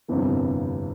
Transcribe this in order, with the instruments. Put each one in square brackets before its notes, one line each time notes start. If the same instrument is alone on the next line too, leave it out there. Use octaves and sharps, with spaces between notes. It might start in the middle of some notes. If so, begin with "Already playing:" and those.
[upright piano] G1 F2 C3 E3 A#3